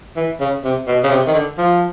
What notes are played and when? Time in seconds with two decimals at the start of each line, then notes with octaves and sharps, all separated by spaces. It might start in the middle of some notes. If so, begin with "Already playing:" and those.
0.16 E3
0.40 C#3
0.64 C3
0.87 B2
1.03 C#3
1.11 C3
1.27 D#3
1.34 D3
1.58 F3